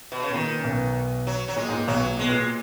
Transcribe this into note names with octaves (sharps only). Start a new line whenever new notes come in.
B2
C#3
B2
A#2 D#3
C#3
B1 B2
F#3
F#3
A#2 G#3
G#2
A#2
B1 B2 F#3
A#2
B2 G#3
A#2